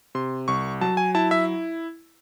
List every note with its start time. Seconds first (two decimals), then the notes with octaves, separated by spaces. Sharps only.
0.15 C3 C6
0.48 C2 C#6
0.81 F#3 A5
0.97 G#5
1.15 E4 A5
1.31 E5